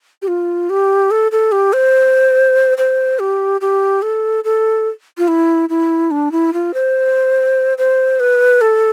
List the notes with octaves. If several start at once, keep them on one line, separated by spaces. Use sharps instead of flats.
G4
F4
G4
A4
A4
G4
C5
C5
G4
G4
A4
A4
F4
E4
E4
D4
E4
F4
C5
C5
B4
A4